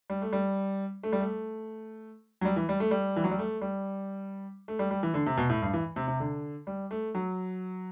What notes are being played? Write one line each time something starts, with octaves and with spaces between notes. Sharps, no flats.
G3
A3
G3
A3
G3
A3
F#3
G3
E3
G3
A3
G3
E3
F#3
G3
A3
G3
A3
G3
G3
E3
D3
C3
B2
A2
G2
E3
C3
C3
D3
G3
A3
F#3